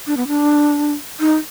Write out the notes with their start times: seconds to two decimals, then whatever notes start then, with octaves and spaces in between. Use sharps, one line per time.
0.07 D4
0.17 B3
0.28 D4
1.20 D#4